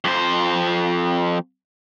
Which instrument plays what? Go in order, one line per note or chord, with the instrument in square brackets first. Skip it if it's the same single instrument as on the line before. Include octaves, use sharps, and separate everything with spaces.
[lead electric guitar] F2 C5